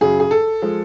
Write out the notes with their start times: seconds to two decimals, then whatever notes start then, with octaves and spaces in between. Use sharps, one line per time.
0.01 F#2 C#3 F#3 G#4
0.20 G#4
0.31 A4
0.62 F3 G#3